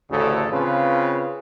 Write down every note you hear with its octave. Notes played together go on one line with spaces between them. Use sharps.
A1 D2 C#3 A4
C#3 C4 F4 B4